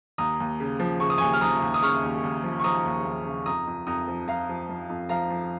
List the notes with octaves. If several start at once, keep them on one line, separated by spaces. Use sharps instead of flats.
D#2 A#5 D#6
D#2
C#3
F3
C#3 C#6
D#6
G#5 C#6
D#2
F6
F3 A#5 D#6
D#2
D#6
C#3 C#6 F6
D#2
D#2
F3
C#6
F3 A#5 D#6
D#2
D#2
C#3
F2 A#5 D#6
F2
F2 A#5 D#6
F3
F3 F5 A#5
F3
F3
F2
F3 F5 A#5
F3